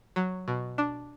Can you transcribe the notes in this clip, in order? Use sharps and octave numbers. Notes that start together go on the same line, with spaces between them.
F#3
B2
D4